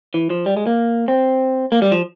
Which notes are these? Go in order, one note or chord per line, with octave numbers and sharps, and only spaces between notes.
E3
F3
G3
G#3
A#3
C4
A#3
G3
F3